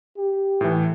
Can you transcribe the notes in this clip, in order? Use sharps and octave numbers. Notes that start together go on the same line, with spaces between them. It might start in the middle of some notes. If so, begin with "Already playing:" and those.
G4
A2 E3